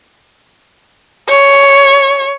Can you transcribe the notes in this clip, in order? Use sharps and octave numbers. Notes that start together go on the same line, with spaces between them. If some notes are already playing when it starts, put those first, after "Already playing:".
C#5